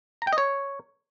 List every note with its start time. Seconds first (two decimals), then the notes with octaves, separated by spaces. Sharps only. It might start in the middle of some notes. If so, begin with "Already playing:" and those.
0.22 A#5
0.27 G5
0.33 D#5
0.38 C#5